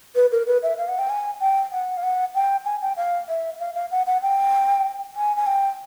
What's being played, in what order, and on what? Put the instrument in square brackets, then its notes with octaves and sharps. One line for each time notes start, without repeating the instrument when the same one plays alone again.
[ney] B4
A#4
B4
E5
F5
F#5
G5
G#5
G5
F#5
F5
F#5
G5
G#5
G5
F5
E5
F5
F5
F#5
F#5
G5
G#5
G#5
G5